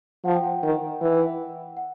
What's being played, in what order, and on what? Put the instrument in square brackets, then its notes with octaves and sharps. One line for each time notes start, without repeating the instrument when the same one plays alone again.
[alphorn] F3 [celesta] F#5
[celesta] G5
F#5
[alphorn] D#3
E3
[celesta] F#5